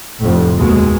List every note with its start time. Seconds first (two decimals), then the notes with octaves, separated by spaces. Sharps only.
0.20 F1 F2 A2
0.57 D#2 B2 G#3